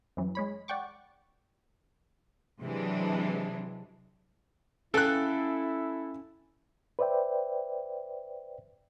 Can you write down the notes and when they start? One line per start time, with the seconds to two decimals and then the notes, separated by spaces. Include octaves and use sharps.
0.17 F#2 E3 F#3
0.35 G#3 C#5 B5
0.68 D5 F#5 G5 C#6 D6
2.61 C3 E3 F#3 G#3 D4
4.94 C#4 E4 A4 F5 G5 F#6
6.99 B4 C5 D5 E5 G5